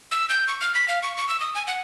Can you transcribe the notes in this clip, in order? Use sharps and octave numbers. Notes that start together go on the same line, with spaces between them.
E6
G6
C#6
F6
B6
F5
C#6
C#6
E6
D#6
G#5
F#5